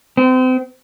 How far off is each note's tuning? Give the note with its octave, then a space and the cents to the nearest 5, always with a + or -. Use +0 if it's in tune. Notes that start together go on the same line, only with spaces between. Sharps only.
C4 -35